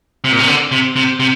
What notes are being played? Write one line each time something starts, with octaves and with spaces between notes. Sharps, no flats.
C3
A#2
C3
D3
C3
C3
C3